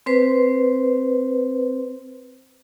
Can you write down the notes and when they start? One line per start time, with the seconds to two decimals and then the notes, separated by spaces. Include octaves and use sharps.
0.06 C4 B4 C5